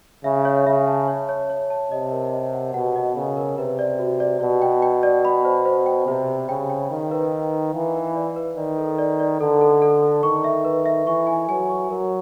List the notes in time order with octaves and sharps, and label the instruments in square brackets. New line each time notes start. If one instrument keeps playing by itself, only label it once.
[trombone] C#3 [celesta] E5
[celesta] C#5
[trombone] C#3 [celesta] E5
[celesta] A5
C#5
C#5
C#5
A5
[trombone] C3 [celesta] D#5
[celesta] A#4
D#5
F#5
[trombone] B2 [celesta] F#5
[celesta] D#5
[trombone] C#3 [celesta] A#4
[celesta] A#4
[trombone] C3 [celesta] B4
[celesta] D5
F#4
D5
[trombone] B2 [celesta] D5
[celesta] G5
G5
D5
B5
C5
C5
G5
[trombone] C3 [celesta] C5
[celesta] C5
[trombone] C#3 [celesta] G5
[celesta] G5
[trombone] D#3 [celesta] F5
[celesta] B4
B4
B4
[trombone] E3 [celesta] F5
[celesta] B4
D5
B4
[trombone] D#3 [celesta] D5
[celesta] A4
D5
D5
[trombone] D3 [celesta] A4
[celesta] A4
A4
A4
[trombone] D#3 [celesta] C#6
[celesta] E5
B4
E5
[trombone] E3 [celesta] C#6
[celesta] G#5
[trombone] F#3 [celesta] G#5
[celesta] C#6
[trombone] F#3 [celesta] A#4